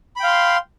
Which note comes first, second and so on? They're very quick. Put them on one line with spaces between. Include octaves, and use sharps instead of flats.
B5 G5 F5 C6